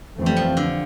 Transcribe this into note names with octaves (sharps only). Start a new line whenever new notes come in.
F2 E3 A3 C4
G3
F3
D3